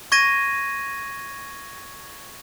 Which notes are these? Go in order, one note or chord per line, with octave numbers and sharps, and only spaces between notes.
C#6 G#6 A#6 D#7